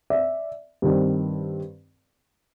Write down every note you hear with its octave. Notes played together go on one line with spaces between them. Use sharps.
D5 E5
G2 D#3 G3 C4